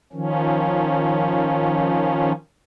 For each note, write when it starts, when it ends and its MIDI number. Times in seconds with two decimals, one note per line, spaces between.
0.13 2.32 51
0.13 2.32 53
0.13 2.32 61